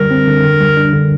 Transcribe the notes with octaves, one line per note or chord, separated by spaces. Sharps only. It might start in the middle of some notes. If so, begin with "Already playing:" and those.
Already playing: D3 G3 A#4
C4
D3
D3
G3
D4
D3